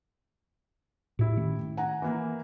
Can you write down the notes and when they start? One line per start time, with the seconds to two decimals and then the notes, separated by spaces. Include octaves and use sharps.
1.19 A2 E4 G4
1.37 D#3 A3 C#4
1.77 F#5 G#5 A#5
2.02 E3 A#3